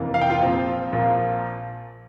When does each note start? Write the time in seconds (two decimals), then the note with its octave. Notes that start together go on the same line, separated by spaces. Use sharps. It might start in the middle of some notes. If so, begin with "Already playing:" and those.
Already playing: F1 F2 E3 A#3
0.14 F5
0.21 G5
0.30 F4 F5
0.40 A#1 A#2 F3 C4
0.92 A#1 A#2 F3 A#3